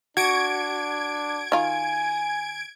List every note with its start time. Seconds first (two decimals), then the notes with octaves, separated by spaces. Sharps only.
0.17 D4 F#4 G#6 D7
1.52 D#3 F4 G#5